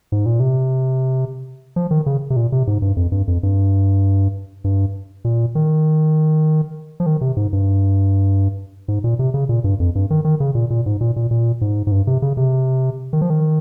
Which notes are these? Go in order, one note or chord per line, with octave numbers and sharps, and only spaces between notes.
G#2
A#2
C3
F3
D#3
C#3
C3
A#2
C3
G#2
G2
F2
G2
F2
G2
G2
A#2
D#3
F3
D#3
C3
G#2
G2
G#2
A#2
C3
C#3
A#2
G2
F2
G2
D#3
D#3
C#3
A#2
A#2
G#2
A#2
A#2
A#2
G#2
G#2
G2
C3
C#3
C3
D#3
F3
D#3